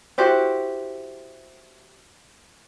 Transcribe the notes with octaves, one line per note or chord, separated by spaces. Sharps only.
E4 F#4 G4 C5